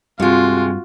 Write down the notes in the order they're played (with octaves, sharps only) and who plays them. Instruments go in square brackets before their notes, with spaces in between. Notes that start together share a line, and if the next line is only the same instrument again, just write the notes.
[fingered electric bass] G2 [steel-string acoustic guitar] C3 G#3 [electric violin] F4 F#4